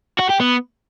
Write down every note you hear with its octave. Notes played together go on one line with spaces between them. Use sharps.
F#4
G4
B3